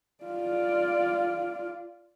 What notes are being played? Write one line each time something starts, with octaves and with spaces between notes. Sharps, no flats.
F4 D5